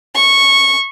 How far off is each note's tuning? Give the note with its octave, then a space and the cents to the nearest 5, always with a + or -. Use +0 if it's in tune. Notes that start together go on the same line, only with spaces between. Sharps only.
C#6 -10